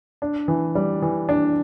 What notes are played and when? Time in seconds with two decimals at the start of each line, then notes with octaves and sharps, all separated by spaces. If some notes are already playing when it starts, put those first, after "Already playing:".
0.22 D4
0.48 E3
0.75 G3
1.02 E3
1.29 D4